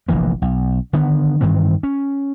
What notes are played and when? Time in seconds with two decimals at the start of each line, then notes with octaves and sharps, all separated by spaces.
0.08 F1 A#1 E3 A#3
0.42 B1
0.93 D3 D#3 B3
1.41 G2 D#3 E3 C4
1.83 C#4